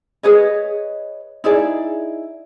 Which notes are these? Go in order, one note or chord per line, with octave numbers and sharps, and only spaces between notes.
G#4 B4 C#5 D#5
D#4 E4 G#4 D5